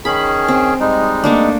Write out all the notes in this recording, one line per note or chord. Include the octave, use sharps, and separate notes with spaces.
D#3 C#4 G#4 B5
C4
G3 G#3 D#4
A3 A#3 D4